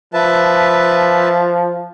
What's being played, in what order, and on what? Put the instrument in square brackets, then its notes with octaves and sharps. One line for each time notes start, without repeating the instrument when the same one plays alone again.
[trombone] F3 [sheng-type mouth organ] B4 E5 A5